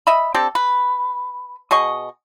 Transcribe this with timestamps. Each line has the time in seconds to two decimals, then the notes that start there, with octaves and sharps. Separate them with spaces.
0.07 D#5 E5 B5
0.34 C4 D4 G4 A4
0.55 B4
1.71 B2 G#4 D#5 C#6